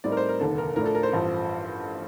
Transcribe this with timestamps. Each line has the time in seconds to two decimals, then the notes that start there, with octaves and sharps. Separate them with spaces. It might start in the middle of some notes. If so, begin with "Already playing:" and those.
0.04 A2 G3 C4 D#4 D5
0.12 A#4
0.17 C5
0.29 A#4
0.40 F1 D#2 D3 A4
0.58 A#4
0.76 A2 F3 A3 D4 A#4
0.86 A4
0.95 A#4
1.03 C5
1.13 A1 G2 F3